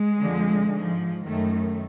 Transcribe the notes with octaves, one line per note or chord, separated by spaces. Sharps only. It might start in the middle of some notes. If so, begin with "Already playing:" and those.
Already playing: G#3
F2 D3 F3
G#2 F3
F#2 D#3 A3